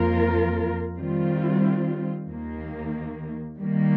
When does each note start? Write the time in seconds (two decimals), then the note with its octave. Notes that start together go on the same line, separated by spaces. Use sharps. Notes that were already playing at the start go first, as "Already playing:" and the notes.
Already playing: F2 F3 A#3 F4 A#4
0.97 D#3 G3 C4 F4
2.28 D#2 D#3 A#3
3.60 D#3 G3 A#3